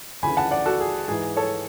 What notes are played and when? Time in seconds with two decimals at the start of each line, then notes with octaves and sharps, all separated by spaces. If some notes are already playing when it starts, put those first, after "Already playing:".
0.22 D2 C#3 E3 G#5 B5
0.37 F#5 A5
0.51 D5 F#5
0.66 F#4 A4
0.80 G#4
1.08 G#2 E3 G#4
1.36 A4 C#5